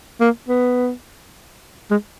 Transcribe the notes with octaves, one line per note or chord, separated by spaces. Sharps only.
A#3
B3
G#3